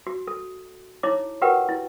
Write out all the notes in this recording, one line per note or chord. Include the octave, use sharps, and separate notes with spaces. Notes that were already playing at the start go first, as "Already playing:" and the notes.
F#4
A4
D#4 E4 C#5 A#5 D6
F#4 G4 A#4 B4 F#5 G5
E4